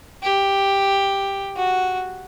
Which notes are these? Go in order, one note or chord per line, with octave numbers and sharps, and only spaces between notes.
G4
F#4